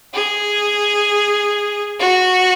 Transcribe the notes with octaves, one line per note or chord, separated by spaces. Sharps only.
G#4
F#4